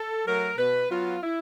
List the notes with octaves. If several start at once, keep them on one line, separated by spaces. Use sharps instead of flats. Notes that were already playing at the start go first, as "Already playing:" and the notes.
Already playing: A4
F#3 A3 A#4
B2 B4
F#3 B3 F4
E4